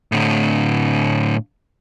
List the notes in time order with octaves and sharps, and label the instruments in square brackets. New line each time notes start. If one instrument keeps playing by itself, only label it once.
[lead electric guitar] A2 D3